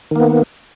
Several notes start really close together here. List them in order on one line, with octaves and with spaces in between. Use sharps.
D#3 A#3 B3